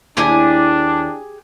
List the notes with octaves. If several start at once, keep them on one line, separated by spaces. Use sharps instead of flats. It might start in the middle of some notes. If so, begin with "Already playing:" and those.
D#2 D4 E4 G4 G#4 G#5